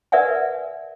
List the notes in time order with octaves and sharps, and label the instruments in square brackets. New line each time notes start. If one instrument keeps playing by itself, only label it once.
[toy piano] A#4 B4 D5 E5 F#5 G#5